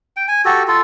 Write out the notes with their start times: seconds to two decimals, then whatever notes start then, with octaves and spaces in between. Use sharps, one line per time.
0.17 G5
0.28 G#5
0.45 F#4 G4 A4
0.68 F4 A4